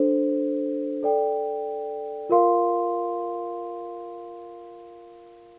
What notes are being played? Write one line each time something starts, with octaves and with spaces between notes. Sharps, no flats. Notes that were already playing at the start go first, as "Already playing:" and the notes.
Already playing: D4 A4 C5
A4 D5 G5
F4 A#4 F5 C6